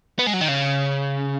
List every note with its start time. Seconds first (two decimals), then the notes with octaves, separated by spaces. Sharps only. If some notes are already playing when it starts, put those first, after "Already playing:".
0.19 B3
0.27 G#3
0.34 F#3
0.41 D#3
0.48 C#3